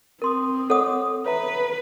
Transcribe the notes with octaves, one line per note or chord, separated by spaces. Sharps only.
C4 A#4 C6 D#6
A4 C#5 F#5 D6 D#6
B4 C#5 E5 A#5